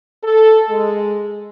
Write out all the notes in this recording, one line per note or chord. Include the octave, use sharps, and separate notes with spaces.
A4
G#3